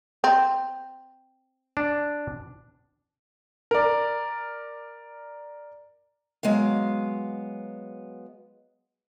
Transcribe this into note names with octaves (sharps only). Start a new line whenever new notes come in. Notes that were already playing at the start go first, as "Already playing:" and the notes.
C4
D4
A#4 D5
F#3 G#3 B3 F5